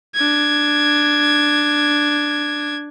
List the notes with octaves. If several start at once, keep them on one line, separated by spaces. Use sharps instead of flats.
D4 G#6